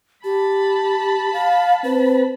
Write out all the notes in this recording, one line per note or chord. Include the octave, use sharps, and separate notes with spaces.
G4 A5 B5
F5
C4 B4